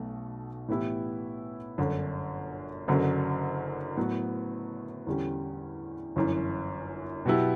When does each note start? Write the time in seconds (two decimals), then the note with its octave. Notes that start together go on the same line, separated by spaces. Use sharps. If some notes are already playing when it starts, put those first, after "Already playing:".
Already playing: B1 B2 A3
0.68 A2 E3 B3 E4 G4
1.78 G1 F#2 D3
2.88 F#1 F#2 D3 F#3
3.97 A2 F#3 B3
5.07 E2 D3 G3 C#4 G4
6.16 G1 F#2 E3
7.25 B2 F#3 B3 E4 G4